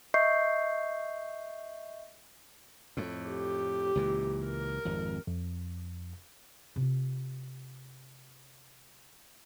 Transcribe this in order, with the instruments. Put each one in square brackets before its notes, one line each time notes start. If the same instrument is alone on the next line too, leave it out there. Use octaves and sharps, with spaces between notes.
[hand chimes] D#5 E5 C#6 G6 C7
[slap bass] F2 A2
[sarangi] G4
[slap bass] C#2 A#2 E3
[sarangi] A#4
[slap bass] G#1 F2
[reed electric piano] F2
[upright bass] C3 F4